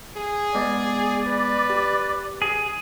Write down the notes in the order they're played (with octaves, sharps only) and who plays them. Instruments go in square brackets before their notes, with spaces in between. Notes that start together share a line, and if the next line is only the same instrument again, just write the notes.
[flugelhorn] G#4
[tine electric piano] G#3 B3 G#5 [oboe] D5
[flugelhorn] B4
[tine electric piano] G4
[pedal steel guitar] G#4